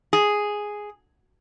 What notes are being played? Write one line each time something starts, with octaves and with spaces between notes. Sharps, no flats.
G#4